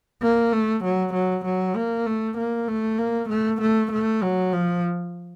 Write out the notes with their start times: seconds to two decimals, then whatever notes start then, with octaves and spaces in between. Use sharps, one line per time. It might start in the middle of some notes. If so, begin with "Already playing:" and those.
0.22 A#3
0.53 A3
0.84 F#3
1.14 F#3
1.45 F#3
1.76 A#3
2.06 A3
2.38 A#3
2.68 A3
2.99 A#3
3.30 A3
3.62 A3
3.92 A3
4.23 F#3
4.53 F3